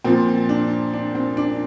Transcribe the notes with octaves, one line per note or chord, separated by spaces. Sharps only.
A#2 F3 C4
D4
D4
C4
D4